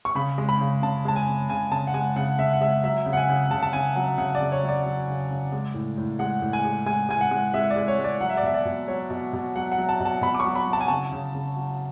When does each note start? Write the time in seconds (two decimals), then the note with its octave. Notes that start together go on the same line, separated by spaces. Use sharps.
0.05 C#6
0.15 C#3 B5
0.38 G#3
0.49 B5
0.61 C#3
0.82 C#3 A5
1.05 G#3 A5
1.16 G#5
1.28 C#3
1.49 C#3 G#5
1.71 C#3 A5
1.87 F#5
1.94 G#3 G#5
2.16 C#3 F#5
2.39 C#3 E5
2.53 F#5
2.61 G#3 E5
2.84 F#3 E5
3.06 C#3
3.13 F#5
3.17 G#5
3.29 C#3
3.51 C#3 A5
3.63 A5
3.73 C#3 G#5
3.96 F#3 F#5
4.18 C#3 F#5
4.35 D5
4.41 C#3
4.52 C#5
4.63 F#3
4.68 D5
4.86 F#3
5.08 C#3
5.31 C#3
5.52 G#3
5.74 A2
5.98 A2
6.19 G#3 F#5
6.42 A2
6.53 G#5
6.65 G#3
6.86 G#3 G#5
7.09 G#3 G#5
7.21 F#5
7.31 G#3
7.54 G#3 E5
7.70 D5
7.76 G#3
7.88 C#5
7.99 G#3
8.04 D5
8.21 F#3 F#5
8.29 E5
8.37 D5
8.43 B2 E5
8.54 D5
8.66 B2
8.88 F#3 C#5
9.10 B2
9.33 B2
9.56 F#3 F#5
9.72 F#5
9.78 F#3
9.89 A5
10.00 B2
10.06 A5
10.22 B2 B5
10.35 D6
10.40 C#6
10.45 F#3
10.55 B5
10.67 F#3
10.73 A5
10.81 G#5
10.88 C#3 A5
11.12 C#3
11.34 C#3
11.56 F#3